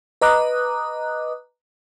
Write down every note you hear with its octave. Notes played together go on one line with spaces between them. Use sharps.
B4 D#5 A#5 D6 D#6 F#6